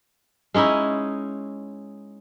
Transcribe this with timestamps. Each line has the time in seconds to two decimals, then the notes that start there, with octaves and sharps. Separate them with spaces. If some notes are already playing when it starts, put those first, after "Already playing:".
0.54 G#3 C#4 D#4 E4